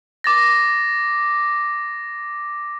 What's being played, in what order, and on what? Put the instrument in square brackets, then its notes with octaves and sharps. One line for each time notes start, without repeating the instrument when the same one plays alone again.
[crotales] D6 A6 A#6